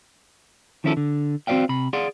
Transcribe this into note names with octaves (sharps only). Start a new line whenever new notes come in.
D#3 F3 C#4 E4 G#4 A4
D3
C4 F#4 C5 D5 F5 G5
C3 B5
G#4 D5 F5 F#5 C6